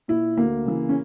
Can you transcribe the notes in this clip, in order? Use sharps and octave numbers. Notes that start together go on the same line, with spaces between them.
A#2 E4
D2 A#3
C#3 E3
C#4